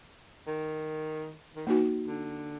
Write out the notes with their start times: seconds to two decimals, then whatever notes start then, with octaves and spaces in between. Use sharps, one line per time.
0.47 D#3
1.56 D#3
1.67 E3 A#3 D#4 F#4
2.07 D3